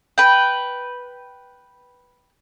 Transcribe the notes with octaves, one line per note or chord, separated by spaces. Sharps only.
B4 G5